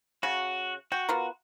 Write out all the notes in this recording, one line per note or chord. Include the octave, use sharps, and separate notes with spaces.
C#3 F#4
F#4 G5
B3 F4 A#4